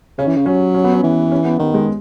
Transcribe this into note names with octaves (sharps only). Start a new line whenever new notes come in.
C#3 C#4
E3
C#3
F#3 C#4
C#4
B3
C#4
E3
C#4
B3
D#3 B3
G#3